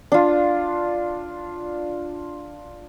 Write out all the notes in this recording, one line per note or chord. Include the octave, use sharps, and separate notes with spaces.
D4 F4